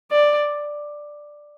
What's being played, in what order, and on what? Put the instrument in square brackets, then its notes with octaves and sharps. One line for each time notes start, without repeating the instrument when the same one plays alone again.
[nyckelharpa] D5